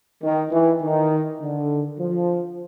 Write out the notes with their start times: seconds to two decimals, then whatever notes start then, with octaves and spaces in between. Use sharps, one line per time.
0.22 D#3
0.50 E3
0.80 D#3
1.40 D3
1.98 F3